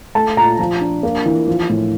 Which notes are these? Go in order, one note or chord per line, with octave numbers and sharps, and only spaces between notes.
A3 A5
A#2 A#5
F3
D4
A#3
E3
F3
A2